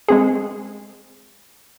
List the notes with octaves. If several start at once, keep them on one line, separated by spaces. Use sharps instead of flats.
G#3 C4 G#4